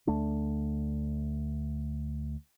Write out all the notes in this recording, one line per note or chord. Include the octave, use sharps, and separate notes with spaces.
D2 A3 D4